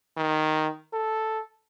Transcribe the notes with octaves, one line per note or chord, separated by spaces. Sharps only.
D#3
A4